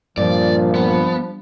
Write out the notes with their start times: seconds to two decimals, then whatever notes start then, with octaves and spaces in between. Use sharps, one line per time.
0.18 G2 A#2 F3 D5
0.75 B3